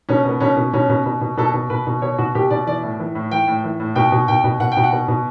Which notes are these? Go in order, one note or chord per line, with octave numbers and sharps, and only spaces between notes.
B2 C#4
B2 B3
B2 C#4
B2
B2 C#4
B2
B2
B2
B2 A4
B2
B2 B4
B2
B2 C#5
B2 F#4
B2 G4
B2 D5
E3 D5
A2
E3
A2
E3 G5
A2
E3
A2
B2 G5
B2
B2 G5
B2
B2 F#5
G5
B2
F#5
B2
B2